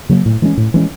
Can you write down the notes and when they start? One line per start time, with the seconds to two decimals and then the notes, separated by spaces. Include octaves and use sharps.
0.09 C#3 F#3 A#3
0.26 A2
0.42 E3 G#3 C#4
0.57 A2
0.74 E3 G#3 C#4